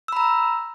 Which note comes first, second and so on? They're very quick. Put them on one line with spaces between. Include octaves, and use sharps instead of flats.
E6 B5 A#5